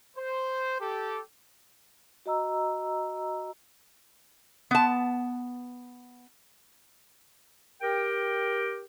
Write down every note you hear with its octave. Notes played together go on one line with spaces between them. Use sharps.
C5
G4 A4
F#4 D#5 A#5 E6
B3 A5
G4 A#4 G5